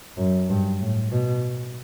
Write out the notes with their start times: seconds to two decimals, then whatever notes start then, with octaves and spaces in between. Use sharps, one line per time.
0.17 F#2
0.49 G2
0.79 A2
1.11 B2